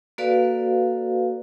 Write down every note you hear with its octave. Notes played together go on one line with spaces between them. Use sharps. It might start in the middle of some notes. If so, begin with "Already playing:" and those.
A#3 F#4 A4 B4 D5 F5